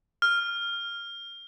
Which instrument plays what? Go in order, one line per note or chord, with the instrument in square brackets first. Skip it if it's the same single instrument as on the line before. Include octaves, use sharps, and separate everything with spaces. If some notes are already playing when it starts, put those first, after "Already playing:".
[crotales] F6